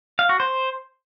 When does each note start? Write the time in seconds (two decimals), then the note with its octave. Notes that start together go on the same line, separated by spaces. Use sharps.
0.19 F5
0.29 F#4
0.40 C5